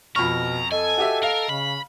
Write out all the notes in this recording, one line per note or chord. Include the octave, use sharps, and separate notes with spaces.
F2 B2 A#5 B5 C#6 F6
A4 D#5 G#5
F#4 G4 E5
A#4 F5
C#3 B5